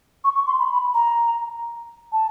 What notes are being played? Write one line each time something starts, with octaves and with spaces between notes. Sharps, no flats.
C#6
C#6
C6
B5
B5
A#5
A5